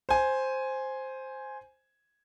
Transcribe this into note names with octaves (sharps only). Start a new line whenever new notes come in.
C5 G#5